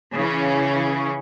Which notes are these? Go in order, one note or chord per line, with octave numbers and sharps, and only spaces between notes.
C#3 E3 C#4